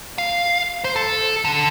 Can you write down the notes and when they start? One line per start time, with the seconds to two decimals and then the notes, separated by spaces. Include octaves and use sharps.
0.18 F5
0.84 C5
0.96 A4
1.45 D3